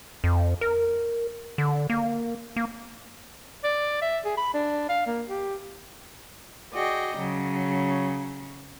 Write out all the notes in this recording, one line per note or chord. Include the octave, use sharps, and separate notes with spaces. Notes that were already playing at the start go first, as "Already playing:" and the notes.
F2
A#4
D3
A#3
A#3
D5
E5
G#4
B5
D4
F5
A#3
G4
F#4 G#4 D5 D#5 G5
C#3 F#3